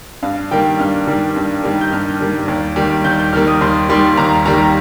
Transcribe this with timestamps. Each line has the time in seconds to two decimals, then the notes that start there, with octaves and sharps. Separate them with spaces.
0.23 G2 F5
0.51 D#3 G3 A#3 G5
0.79 G2 F6
1.07 D#3 G3 A#3
1.36 G2
1.64 D#3 G3 A#3
1.81 G6
1.92 G2 F6
2.21 D#3 G3 A#3
2.48 D#2
2.76 D#3 G3 A#3
3.04 D#2 G6
3.19 G6
3.33 D#3 G3 A#3 F6
3.47 D#6
3.61 D#2 C6
3.89 D#3 G3 A#3 C6
4.18 D#2 A#5
4.46 D#3 G3 A#3 A#5